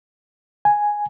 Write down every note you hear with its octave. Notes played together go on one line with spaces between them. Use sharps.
G#5